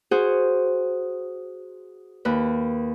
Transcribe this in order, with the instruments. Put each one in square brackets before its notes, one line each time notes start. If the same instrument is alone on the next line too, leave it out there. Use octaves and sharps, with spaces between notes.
[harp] F#4 G#4 C5
D#2 B4